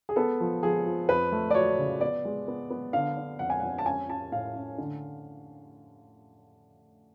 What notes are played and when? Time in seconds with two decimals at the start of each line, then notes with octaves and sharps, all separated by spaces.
0.09 G#4
0.16 B3 A4
0.40 F3
0.63 F3 G#4
0.86 F3
1.09 F2 B4
1.32 A3
1.51 D5
1.54 F#3 C#5
1.79 C#3
2.01 B3 D5
2.25 G#3
2.48 B3
2.70 B3
2.93 D3 F5
3.17 D4
3.39 F2 F#5
3.50 G#5
3.60 F2 F#5
3.78 A5
3.86 C#4 G#5
4.09 C#4 A5
4.32 A2 F5
4.55 C#4
4.78 D3